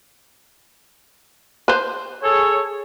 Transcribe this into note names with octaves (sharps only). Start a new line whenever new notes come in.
B4 C5
G#4 A4 C#5